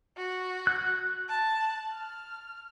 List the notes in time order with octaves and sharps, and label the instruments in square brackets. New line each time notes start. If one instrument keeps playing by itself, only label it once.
[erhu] F#4
[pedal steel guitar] F#6
[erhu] A5
F6